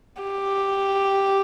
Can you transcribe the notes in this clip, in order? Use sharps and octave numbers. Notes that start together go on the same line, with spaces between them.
G4